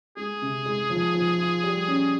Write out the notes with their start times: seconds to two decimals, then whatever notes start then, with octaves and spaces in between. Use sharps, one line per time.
0.17 G#3 G#4
0.42 C3
0.66 G#3
0.90 F3
1.14 F3
1.38 F4
1.63 G3
1.88 C#4